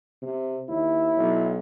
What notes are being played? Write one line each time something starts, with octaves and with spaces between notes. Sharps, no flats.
C3
D#2 E4
B1